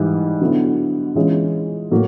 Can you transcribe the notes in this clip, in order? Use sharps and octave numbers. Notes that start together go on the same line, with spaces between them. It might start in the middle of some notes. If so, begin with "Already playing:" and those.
Already playing: G#2 E3 G3
D3 F#3 B3 E4
E3 G#3 C#4 F4
A2 F#3 A#3